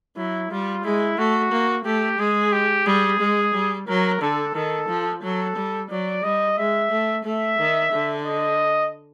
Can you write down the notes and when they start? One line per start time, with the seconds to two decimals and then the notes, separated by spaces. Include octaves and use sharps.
0.17 F#3 E4
0.51 G3 F4
0.84 G#3 E4
1.18 A3 F#4
1.52 A#3
1.85 A3 G4
2.19 G#3 G#4
2.53 G4
2.86 G3 G#4
3.20 G#3
3.54 G3
3.88 F#3 A#4
4.22 D3 A4
4.55 D#3 A4
4.89 F3
5.23 F#3 A4
5.56 G3
5.90 F#3 D5
6.23 G3 D#5
6.57 G#3 E5
6.91 A3
7.25 A3 E5
7.59 D#3
7.93 D3
8.26 D#5